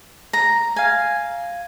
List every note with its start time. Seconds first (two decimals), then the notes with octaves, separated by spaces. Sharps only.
0.33 A#5
0.76 F5 G#5